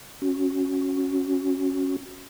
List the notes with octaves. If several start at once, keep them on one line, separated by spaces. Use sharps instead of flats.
C#4 F#4